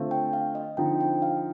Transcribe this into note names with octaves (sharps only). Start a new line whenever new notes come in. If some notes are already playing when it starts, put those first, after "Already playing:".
Already playing: D3 A3 C4 F4 C5
G5
F5
D#5
D3 F3 C4 D#4 G5
G5
F5